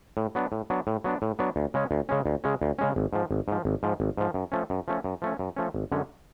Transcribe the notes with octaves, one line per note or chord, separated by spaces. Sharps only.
A2
F#3 B3 D4
A2
F#3 B3 D4
A2
F#3 B3 D4
A2
F#3 B3 D4
D2
C#3 G#3 C#4
D2
C#3 G#3 C#4
D2
C#3 G#3 C#4
D2
C#3 G#3 C#4
G#1
G#2 F3
G#1
G#2 F3
G#1
G#2 F3
G#1
G#2 F3
F#2
F3 A3 C#4
F#2
F3 A3 C#4
F#2
F3 A3 C#4
F#2
F3 A3 C#4
G#1
F#2 D3 G#3 C#4